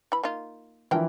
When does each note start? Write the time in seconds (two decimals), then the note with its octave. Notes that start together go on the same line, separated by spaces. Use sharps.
0.12 E3 B5
0.23 A#3 D#4 F4
0.91 E3 F3 D4 E4 A#4 G5